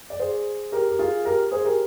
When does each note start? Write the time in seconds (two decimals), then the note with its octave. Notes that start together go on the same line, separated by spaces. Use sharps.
0.10 D5
0.20 G#4 C5
0.72 G4 A#4
0.89 G4
0.99 F4 G#4
1.25 G4 A#4
1.51 G#4 C5
1.64 G4 A#4